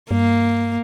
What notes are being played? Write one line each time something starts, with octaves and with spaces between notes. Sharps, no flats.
G2 A#3